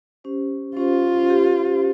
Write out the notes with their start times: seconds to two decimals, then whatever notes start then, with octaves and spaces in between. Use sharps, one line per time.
0.24 C#4 G4 C5
0.77 C#4 F4 G4 C5
1.30 C#4 G4 C5